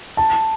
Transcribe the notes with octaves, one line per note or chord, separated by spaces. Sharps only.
A5